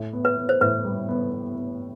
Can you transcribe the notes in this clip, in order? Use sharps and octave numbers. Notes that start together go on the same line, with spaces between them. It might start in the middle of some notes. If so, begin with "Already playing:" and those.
Already playing: A2
B3
B4
B3
C5
A2 B4
G3
B3
B3
B3